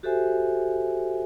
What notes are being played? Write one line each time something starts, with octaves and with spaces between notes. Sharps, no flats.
F#4 G4 A4 C5 E5 G#5